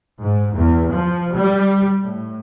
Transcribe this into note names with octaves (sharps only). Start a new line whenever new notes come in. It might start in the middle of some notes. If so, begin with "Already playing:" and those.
G#2
E2
F3
G3
A2